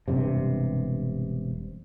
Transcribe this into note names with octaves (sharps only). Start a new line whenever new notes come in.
E1 G2 C3